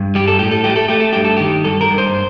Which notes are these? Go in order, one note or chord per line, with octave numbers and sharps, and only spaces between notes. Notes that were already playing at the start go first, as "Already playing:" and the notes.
Already playing: G2
G3 G4
A4
A2 G4
A4
A3 G4
A4
A3 G4
A4
G2 G4
A4
D#3 G4
G2 A4
A#4
G2
C5